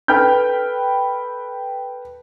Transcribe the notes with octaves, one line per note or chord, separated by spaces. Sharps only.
A4 B4 G5 B5 F6 G6